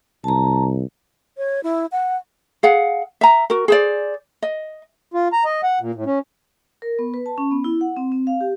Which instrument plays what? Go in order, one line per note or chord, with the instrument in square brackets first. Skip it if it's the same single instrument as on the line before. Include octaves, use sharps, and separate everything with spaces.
[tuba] C2 [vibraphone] A5 A#5
[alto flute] C#5
E4
F#5
[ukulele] G#4 F5 F#5
E5 A#5
F#4 A#4
G#4 C5 D5
D#5
[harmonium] F4
A#5
D#5
F#5
A#2
A2
C#4
[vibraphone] A#4
B3
B4
A5
C#4
B3
E4
F#5
C4
C4
F5
G4